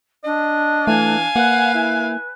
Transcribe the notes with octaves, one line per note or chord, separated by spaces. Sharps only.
D4 D#5
E3 A3 F5 G#5
A#3 B4 F#5
E4